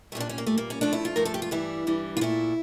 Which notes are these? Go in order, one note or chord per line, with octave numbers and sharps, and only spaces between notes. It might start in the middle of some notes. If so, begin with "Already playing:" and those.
A#2 G3 A3 C#4
D4
C#4
A#3
A#2 G3 A3
A#3
C#4
G2 F3 A3 D4
E4
F4
G2 F3 A3 A#4
A4
G4
F4
G2 E3 G3 E4
G2 E3 G3
F4
A#2 A3 E4